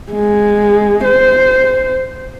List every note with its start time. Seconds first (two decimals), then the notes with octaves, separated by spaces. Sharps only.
0.12 G#3
1.04 C5